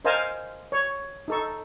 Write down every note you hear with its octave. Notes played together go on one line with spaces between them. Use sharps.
A#4 C5 D#5 F5 G#5 A5
C#5
D#4 A4 C#6